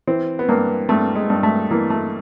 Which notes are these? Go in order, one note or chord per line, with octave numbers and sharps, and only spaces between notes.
E3 C4
B3
G2 A#3
G2 A3
G#3
G2
A3
E3 A#3
A3